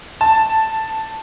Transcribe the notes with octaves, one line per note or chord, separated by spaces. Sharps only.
A5